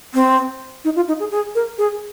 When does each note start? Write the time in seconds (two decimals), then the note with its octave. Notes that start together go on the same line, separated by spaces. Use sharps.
0.14 C4
0.85 D#4
0.96 F4
1.08 D#4
1.20 G#4
1.31 G#4
1.55 A#4
1.78 G#4